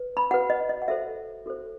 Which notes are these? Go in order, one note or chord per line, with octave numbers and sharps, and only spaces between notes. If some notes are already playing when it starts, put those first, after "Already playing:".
Already playing: B4
B5
F#4 B4 F#5
D#5
D#5
F#5
F#4 A4 C5 E5
F#4 A4 C5